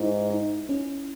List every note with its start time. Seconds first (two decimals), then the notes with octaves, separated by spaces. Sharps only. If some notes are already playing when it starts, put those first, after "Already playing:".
Already playing: G#2 E4
0.30 D#4
0.69 C#4